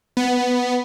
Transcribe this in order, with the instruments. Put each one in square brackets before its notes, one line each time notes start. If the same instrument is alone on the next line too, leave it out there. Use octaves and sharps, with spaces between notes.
[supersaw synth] B3